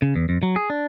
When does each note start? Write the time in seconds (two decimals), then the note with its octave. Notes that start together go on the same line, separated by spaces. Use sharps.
0.02 C#3
0.15 E2
0.29 F2
0.43 F#3
0.56 G#4
0.70 D4